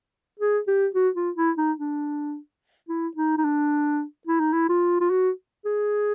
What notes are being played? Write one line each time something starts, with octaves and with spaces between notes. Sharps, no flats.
G#4
G4
F#4
F4
E4
D#4
D4
E4
D#4
D#4
D4
E4
D#4
E4
F4
F4
F#4
G#4